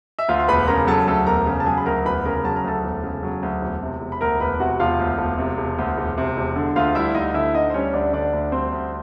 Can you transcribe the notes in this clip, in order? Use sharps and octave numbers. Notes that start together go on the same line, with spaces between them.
E5
D2 F4 F5
C6
E1 B4 B5
C#3 A#4 A#5
F#3 A4 A5
D2 A4 A5
E1 A#4 A#5
C#3
A5
F#3 G#4 G#5
B5
D2 A#4 A#5
E1 B4 B5
C#3 A#4 A#5
F#3 A5
A#5
D2 A4 A5
E1
C#3
F#3
D2
E1
C3
E1
B5
D2 A#4 A#5
E1 B4 B5
C3 F#4 F#5
E1 F4 F5
D2
E1
C3
E1
D2
E1
C3
E1
D3
D2 F4 F5
G3 E4 E5
D2 D#4 D#5
D3 E4 E5
D2 D#4 D#5
C5
G3 C#4 C#5
D2 D4 D5
D3 D4 D5
D2
G3 C4 C5
D2